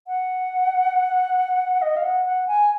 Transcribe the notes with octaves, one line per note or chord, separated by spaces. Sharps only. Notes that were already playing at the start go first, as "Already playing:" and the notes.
F#5
D#5
F5
F#5
F#5
G#5